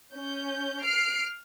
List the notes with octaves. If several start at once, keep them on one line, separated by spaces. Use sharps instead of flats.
C#4 G6
F6 C7 D7